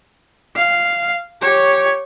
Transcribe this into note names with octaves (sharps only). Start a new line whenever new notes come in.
F5
G4 C#5